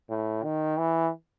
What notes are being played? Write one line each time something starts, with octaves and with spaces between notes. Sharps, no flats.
A2
D#3
E3